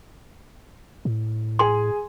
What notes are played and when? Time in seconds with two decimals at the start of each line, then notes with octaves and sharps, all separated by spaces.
1.05 A2
1.59 G#4 G#5 C6